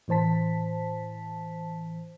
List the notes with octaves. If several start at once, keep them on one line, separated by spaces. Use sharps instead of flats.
A2 E3 C5 A5 B6